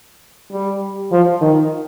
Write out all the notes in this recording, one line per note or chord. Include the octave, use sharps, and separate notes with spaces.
G3
F3
D#3